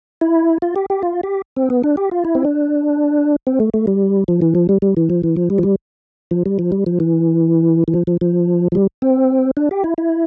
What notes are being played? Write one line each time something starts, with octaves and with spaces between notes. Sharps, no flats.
E4
F4
G4
G4
F4
G4
C4
B3
D4
G4
F4
E4
C4
D4
C4
A3
A3
G3
F3
E3
F3
G3
G3
E3
F3
E3
F3
G3
F3
G3
F3
G3
F3
G3
F3
E3
E3
F3
F3
F3
F3
G3
C4
D4
G4
E4
E4